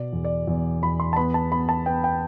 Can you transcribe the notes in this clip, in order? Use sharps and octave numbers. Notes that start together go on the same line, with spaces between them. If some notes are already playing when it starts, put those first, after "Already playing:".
Already playing: B2 D5
E2
D5
E2
E2 B5
C6
A5
B3 B5
A5
B3 B5
A5
B3 G5
G5